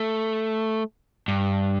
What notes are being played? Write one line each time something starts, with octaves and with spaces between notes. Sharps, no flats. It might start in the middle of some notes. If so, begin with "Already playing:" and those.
Already playing: A3
G2